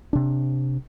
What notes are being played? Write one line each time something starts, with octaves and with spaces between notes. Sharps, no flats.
C3 D4